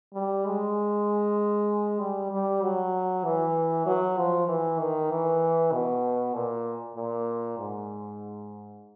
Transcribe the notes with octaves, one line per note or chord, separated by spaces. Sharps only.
G3
G#3
G3
G3
F#3
E3
F#3
F3
E3
D#3
E3
B2
A#2
A#2
G#2